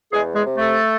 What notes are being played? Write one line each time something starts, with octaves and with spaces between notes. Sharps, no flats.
E2 G#3 G#4
G#3 G#4
C3
A3 A4